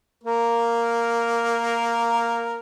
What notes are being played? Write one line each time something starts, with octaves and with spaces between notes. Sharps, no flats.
A#3 A#4